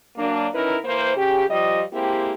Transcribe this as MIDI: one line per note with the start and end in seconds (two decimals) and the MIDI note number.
0.17 0.48 54
0.17 0.48 58
0.17 0.48 62
0.53 0.77 51
0.53 0.77 61
0.53 0.77 63
0.53 0.77 64
0.53 0.77 70
0.53 0.77 71
0.85 1.15 52
0.85 1.15 58
0.85 1.15 71
0.85 1.15 72
1.17 1.45 49
1.17 1.45 67
1.49 1.83 53
1.49 1.83 55
1.49 1.83 75
1.94 2.34 56
1.94 2.34 58
1.94 2.34 60
1.94 2.34 64
1.94 2.34 67